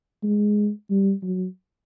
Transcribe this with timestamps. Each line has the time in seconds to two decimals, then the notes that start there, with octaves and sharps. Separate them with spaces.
0.23 G#3
0.90 G3
1.23 F#3